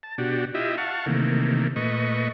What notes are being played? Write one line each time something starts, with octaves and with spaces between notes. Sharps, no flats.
A5
B2 D4 F#4 G4
E4 F4 G4 D#5 E5
F5 F#5 A5 C#6
C3 D#3 E3 A3 A#3
A#2 A3 B4 D#5 C#6